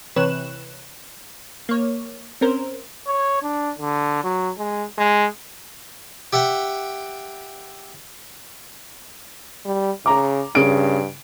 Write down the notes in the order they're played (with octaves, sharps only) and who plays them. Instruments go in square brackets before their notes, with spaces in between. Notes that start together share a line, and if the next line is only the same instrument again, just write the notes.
[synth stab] C3 E3 B4 C#5 F#6 E7
A#3 C#5
C4 C#4 A#4 C5
[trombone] C#5
D4
D3
F#3
G#3
G#3
[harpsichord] G4 E5 F#5 G5
[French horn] G3
[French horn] C#3 [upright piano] A#5 D6
[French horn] G2 [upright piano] C#3 D7